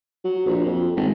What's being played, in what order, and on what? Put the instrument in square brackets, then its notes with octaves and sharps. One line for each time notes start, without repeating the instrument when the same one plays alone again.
[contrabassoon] F#3
A#1
F2
G#1